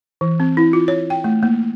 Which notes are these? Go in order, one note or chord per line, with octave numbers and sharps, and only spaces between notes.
E3
C4
E4
F4
C#5
G5
A3
A#3